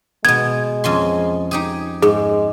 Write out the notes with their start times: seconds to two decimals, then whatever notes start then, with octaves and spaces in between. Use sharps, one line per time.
0.25 B2 G#3 B3 G#6
0.84 F2 C#4 C6
1.51 D#4 G4 G#4
2.03 G#2 G#3 G#4